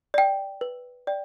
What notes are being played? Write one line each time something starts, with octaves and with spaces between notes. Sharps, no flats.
D5 G5
B4
D5 G5